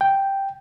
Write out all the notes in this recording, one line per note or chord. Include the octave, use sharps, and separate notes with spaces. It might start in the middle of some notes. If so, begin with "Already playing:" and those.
G5